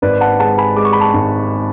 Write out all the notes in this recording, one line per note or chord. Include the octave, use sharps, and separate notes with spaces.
G#1 B4 D5
F#5 A5
G#3 F#5 A5
G#5 B5
G#3 D6
C#6
B5
A5 C#6
G#1